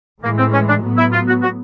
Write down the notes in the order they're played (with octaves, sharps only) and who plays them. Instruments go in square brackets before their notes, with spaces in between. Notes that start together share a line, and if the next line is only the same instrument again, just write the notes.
[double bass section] A2 E3 G#3 [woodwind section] A#3
[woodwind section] C4
C#4
D4
[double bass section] A2 F#3 B3
[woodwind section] E4
F4
F#4
F#4